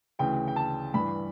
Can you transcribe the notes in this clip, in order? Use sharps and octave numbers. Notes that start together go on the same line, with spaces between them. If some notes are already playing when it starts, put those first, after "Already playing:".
D2 C#3 E3 G5
G5
A5
G2 E3 B5